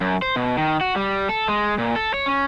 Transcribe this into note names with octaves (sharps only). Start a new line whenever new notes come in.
F#2
C5
B2
D#3
F#4
G3
A4
G#3
A#2
A4
C#5
C#4